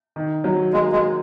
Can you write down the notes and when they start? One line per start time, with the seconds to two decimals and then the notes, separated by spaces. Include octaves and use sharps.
0.16 D#3
0.44 F#3
0.73 G#3 A#3
0.92 G#3